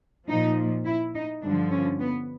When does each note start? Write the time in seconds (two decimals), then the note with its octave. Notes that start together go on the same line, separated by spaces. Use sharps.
0.28 A#2 F3 D#4
0.85 E4
1.14 D#4
1.42 G2 D3 F3 D4
1.71 C#4
2.00 B3